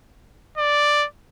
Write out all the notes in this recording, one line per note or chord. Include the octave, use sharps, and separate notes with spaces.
D5